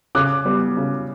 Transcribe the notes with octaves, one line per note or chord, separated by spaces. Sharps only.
C#3 D6 F#6
G3 B3
C#3